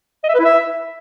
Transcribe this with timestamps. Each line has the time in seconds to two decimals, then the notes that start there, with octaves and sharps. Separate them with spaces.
0.24 D#5
0.29 E5
0.34 B4
0.40 E4
0.45 E5